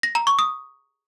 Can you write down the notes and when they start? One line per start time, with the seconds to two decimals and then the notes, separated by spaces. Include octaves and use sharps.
0.03 A#6
0.15 A#5
0.27 C#6
0.39 D#6